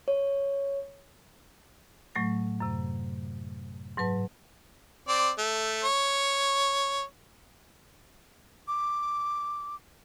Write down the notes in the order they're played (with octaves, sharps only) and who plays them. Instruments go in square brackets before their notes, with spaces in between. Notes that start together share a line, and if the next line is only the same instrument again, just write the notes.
[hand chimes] C#5
[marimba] A2 F#3 A3 A6 A#6
F#2 C3
G#2 F#3 B4 A5
[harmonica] C4 D5
A3
C#5
[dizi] D6